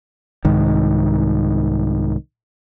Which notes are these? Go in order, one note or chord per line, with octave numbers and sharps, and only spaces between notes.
C2 G#2 D#3